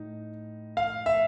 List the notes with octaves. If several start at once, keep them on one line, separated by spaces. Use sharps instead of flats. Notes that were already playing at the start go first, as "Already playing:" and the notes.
Already playing: A2 D#4
F5
E5